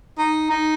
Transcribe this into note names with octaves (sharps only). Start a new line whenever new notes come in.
D#4
D#4